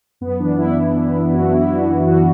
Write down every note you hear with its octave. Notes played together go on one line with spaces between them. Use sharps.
F#2 B3
E3 D4
F#2 E4
E3
E3
E3
F#2 F#4
F#2 E4
E4
E3 F#4
E3
F#2 F#4